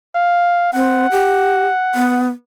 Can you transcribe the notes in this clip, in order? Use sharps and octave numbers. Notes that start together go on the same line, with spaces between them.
F5
C4 F#5
G4
B3